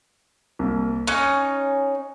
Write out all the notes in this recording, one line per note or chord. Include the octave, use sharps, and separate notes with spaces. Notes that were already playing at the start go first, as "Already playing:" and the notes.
C2 A#3
C#4 D#4 C#6 F#6